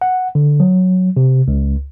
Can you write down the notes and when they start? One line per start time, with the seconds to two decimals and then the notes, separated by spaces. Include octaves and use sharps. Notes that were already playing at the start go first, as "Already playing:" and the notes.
0.01 F#5
0.35 D3
0.60 F#3
1.17 C3
1.48 C#2